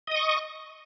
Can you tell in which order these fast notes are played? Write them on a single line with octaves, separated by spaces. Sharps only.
D#5 D#6 C#6